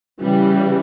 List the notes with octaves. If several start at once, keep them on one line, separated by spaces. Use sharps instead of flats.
C#3 E3 G3